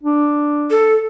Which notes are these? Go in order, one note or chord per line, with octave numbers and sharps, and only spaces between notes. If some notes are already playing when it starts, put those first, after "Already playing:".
D4
A4